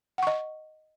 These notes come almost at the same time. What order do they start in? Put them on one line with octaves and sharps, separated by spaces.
F#5 C#6 D#5